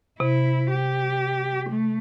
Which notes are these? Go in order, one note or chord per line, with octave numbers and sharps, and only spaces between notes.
C3 E4
G4
A3